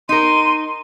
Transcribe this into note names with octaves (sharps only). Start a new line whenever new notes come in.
D#4 A#4 C6 D#7